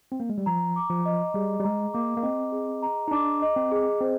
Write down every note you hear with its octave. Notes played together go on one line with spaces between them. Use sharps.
C4
A#3
G#3
G3
F3 A#5
D6
F3
D#5
G3 G#4
G3
G#3 A#5
A#3 D6
A#3
C4 D#5
G#4
A#5
D#4
D4 D6
D#5
C4
G#4
C4 C5